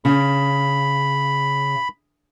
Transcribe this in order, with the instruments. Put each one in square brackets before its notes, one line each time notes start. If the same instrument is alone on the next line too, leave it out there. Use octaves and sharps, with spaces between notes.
[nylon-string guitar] C#3 [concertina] B5